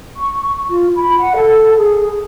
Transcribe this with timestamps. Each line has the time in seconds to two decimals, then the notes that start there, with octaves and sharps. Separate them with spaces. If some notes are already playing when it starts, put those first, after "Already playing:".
0.16 C#6
0.68 F4
0.97 B5
1.19 F#5
1.35 A4
1.77 G#4